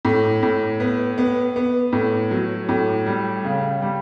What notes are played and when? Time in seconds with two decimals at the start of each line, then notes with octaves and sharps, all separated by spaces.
0.05 A2
0.43 A2
0.80 B3
1.18 B3
1.56 B3
1.93 A2
2.31 F#3
2.69 A2
3.06 G3
3.45 C#3
3.82 G3